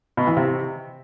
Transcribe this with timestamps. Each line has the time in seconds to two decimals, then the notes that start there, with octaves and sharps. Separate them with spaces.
0.17 B2
0.27 E3
0.37 C3